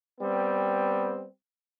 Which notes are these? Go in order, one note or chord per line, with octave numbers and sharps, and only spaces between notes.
G3 B3 C4